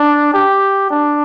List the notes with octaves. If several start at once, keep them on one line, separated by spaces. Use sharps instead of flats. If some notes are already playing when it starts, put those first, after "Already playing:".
Already playing: D4
G4
D4